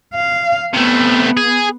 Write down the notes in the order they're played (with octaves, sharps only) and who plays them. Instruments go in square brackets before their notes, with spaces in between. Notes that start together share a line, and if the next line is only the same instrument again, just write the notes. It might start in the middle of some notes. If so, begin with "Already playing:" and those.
[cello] F5
[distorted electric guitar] C3 A3 [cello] B3
[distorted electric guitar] G#4